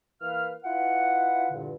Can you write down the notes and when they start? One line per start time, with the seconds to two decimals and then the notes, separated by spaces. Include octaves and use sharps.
0.21 E3 A#3 B4 F5 F6
0.64 E4 F4 B4 F#5
1.50 E2 G2 A#2 D3